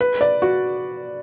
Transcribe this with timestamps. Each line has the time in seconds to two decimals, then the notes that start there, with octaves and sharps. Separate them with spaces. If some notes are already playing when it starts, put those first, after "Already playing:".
0.01 B4
0.21 D5
0.42 F#4